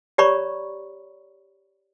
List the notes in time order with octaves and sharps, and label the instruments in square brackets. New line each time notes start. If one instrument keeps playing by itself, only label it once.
[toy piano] G4 C#5 D5 A#5 B5 C#6